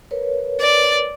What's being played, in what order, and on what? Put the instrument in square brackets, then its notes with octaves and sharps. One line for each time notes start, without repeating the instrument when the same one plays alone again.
[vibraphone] A#4 B4 C#5
[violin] D5